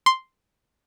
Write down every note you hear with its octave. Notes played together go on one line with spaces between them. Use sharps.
C6